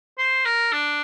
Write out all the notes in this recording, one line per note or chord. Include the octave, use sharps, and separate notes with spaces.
C5
A#4
D4